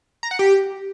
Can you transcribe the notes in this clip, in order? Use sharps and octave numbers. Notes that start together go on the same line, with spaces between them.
A#5
F#5
G4